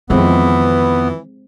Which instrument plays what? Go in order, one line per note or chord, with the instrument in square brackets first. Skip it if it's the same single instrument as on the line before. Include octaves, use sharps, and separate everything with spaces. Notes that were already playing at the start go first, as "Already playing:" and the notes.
[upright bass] F2 D#3 [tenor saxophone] E3 [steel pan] G#3 C4 [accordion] B3